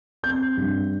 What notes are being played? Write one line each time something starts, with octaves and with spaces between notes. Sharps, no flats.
C4 G6
G2